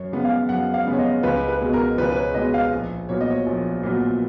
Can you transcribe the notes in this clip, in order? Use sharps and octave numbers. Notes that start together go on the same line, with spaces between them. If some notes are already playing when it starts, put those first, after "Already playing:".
Already playing: F#2 C#5
C#3 G#3 B3
F5
F#2 F#5
F5
C#3 G#3 B3
C#5
D#5
C#2 B4
B4
B2 G#3
A#4
C#2 B4
B4
C#5
B2 G#3 D#5
F5
A#1
A#2 F#3 B3 C#5
D#5
C#5
A#1
A#2 F#3 B3